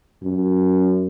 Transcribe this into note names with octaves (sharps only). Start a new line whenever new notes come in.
F#2